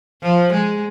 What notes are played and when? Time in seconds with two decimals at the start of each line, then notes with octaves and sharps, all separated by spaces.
0.22 F3
0.52 G#3